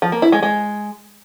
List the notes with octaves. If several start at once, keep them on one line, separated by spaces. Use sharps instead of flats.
F3
A#3
E4
G#3
G#3